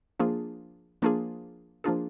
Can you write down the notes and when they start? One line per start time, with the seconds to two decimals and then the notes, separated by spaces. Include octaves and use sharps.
0.19 F3 A#3 D4 F4 G#4
1.02 F3 A#3 D4 F4 G#4
1.84 F3 A#3 D4 F4 G#4